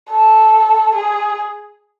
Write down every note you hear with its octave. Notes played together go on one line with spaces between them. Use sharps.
A4
G#4